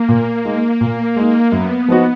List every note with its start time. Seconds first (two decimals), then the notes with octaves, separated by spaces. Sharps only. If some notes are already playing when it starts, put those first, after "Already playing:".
Already playing: A#3
0.09 A#2
0.45 G#3 D#4
0.81 A#2
1.16 G#3 D#4
1.52 F#2 B3
1.88 F3 B3 D#4 F#4